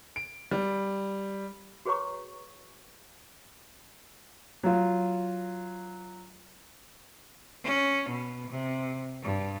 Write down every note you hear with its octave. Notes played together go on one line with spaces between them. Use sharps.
D7
G3
F#4 G#4 B4 C#5 A#5 C#6
F#3 F4
C#4
B2
C3
G2